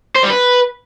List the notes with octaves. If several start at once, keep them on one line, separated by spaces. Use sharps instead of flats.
C5
G3
B4